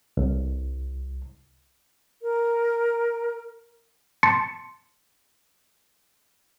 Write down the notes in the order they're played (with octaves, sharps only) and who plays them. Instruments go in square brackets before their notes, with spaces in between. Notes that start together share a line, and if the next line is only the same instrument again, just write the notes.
[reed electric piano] C2
[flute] A#4
[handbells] A5 C6 A6 C#7